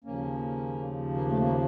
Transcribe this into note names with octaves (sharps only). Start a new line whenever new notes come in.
D#2 C#3 F3 A#3 C#4
A#3
A3
A#3